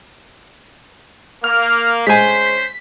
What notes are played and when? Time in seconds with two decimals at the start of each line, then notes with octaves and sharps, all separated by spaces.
1.44 A#3 F6
2.07 G#3 C#4 C5 G#5 B6